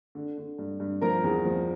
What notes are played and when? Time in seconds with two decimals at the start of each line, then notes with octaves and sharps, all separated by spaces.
0.15 D3
0.38 D3
0.59 G2
0.80 G2
1.01 F3 A#4 A#5
1.24 E2
1.45 F3